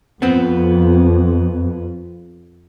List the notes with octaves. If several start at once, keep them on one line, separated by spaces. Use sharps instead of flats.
F2 B3 C4